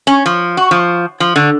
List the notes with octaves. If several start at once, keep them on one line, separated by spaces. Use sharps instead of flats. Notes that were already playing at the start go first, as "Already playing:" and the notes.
C#4
F3
F#4
F3
F3
D3